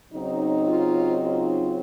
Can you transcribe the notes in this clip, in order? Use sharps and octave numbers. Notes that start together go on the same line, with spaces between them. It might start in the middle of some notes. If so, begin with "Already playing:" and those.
C#3 F#3 C4 D#4
F4
F4